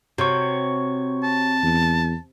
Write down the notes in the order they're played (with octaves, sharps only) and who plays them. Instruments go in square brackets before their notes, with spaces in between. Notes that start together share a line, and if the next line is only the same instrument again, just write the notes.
[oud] C3 [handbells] F#4 C#5 C#6
[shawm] A5
[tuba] E2